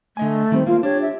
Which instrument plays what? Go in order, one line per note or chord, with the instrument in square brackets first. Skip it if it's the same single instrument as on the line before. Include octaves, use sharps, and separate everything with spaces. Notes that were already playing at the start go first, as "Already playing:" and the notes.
[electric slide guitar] D3 D#5 G#5 [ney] A3
[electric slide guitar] D#3 G3 [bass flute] C4
[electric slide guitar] A#3 [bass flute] F4 [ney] F5
[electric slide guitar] D4 [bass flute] G4 [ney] C#5
[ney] E5